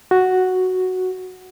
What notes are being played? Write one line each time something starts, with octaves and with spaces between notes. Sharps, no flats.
F#4